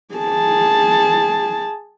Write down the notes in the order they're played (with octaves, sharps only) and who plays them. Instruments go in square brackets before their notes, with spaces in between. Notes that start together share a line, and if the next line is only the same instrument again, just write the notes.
[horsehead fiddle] G#4 A5